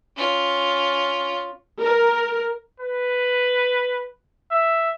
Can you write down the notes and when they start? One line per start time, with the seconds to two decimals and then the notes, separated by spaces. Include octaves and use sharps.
0.16 C#4 F4
1.81 A#4
2.80 B4
4.51 E5